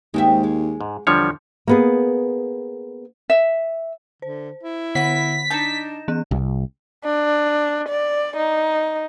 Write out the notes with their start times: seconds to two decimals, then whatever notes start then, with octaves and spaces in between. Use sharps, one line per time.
0.14 D#2 G#3 C4 E5
0.44 G#3
0.81 G#2
1.07 E2 D3 F3 G3 C#5
1.67 A#3 B3 G#4
3.30 E5
4.22 D3 C5
4.63 E4
4.95 D3 F#4 B4 B6
5.50 D4 D#4 A5 G6 A#6 E7
6.08 E3 B3 F#6
6.31 C2
7.04 D4
7.89 D5
8.36 D#4